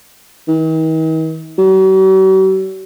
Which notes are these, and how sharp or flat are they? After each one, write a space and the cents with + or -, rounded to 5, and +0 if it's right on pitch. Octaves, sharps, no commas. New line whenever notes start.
D#3 +45
F#3 +45